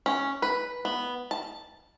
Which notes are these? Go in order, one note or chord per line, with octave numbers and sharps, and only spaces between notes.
C#4
B4
B3
A5